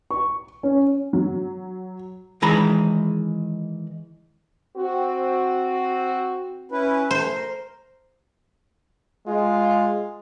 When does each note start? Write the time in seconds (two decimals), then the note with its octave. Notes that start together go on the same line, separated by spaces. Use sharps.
0.11 C#6
0.63 C#4
1.13 F#3
2.42 D#3 E3 G#3 A#5 B5
4.77 C4 F#4
6.71 C#4 E4 B4
7.11 A3 C5
7.34 A#4
9.28 G#3 F4